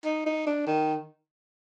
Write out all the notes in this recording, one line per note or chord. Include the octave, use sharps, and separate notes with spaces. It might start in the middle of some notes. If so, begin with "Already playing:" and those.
D#4
D#4
D4
D#3